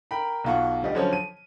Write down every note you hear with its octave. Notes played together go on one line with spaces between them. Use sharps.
A#4 G5 A#5 B5
B1 B2 F4 F#5 C#6
D2 G3 D#5
D3 F3 F#3 C#4 C#5
D#7